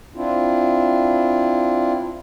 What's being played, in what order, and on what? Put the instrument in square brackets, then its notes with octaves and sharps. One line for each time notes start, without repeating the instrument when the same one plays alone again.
[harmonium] C4 D4 E4 F4